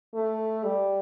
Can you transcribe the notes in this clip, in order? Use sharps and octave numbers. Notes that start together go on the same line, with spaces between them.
A3
G3